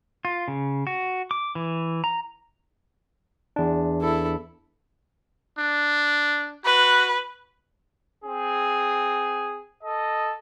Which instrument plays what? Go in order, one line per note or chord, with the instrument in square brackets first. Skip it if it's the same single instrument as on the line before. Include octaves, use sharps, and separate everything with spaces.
[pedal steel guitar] F4
C#3
F#4
D6
E3
A#5
[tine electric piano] E2 D4
[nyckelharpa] E4 A4
[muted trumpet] D4
[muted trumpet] F#4 [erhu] B4
[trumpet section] C4 G#4
A4 D#5